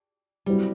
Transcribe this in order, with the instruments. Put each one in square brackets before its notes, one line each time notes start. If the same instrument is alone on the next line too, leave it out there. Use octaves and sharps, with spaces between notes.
[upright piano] C3 F#3 C4 E4 [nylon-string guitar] G3